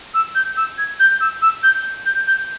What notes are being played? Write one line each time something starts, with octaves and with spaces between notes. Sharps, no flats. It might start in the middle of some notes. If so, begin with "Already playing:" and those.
E6
G6
E6
G#6
G6
E6
E6
G6
G6
G6